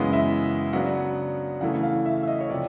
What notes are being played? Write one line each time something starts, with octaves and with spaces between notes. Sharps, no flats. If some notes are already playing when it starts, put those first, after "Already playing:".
Already playing: F#2 C#3 E3 G#3 B3
E5
C#3 F#3 B3 D4 F#5
C#3 E3 A3 F#5
F5
E5
E5
D#5
C#5
C3 F3 D5